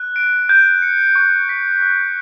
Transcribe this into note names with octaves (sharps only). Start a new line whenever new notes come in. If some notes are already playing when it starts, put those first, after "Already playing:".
Already playing: F#6
D7
G6
C#7
C#6
B6
F#6